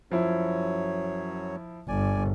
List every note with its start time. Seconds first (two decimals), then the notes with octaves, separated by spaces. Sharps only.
0.11 F#2 F3 F#3 E4 C#5
1.88 G1 D5 G#5